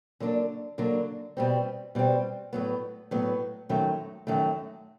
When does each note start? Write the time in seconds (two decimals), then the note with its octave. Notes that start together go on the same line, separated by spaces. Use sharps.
0.20 D3 F#3 A#3 D4
0.78 D3 F#3 A#3 D4
1.37 B2 G3 C4
1.95 B2 G3 C4
2.53 A2 F#3 B3
3.11 A2 F#3 B3
3.69 F#2 D#3 F#3 A3
4.27 F#2 D#3 F#3 A3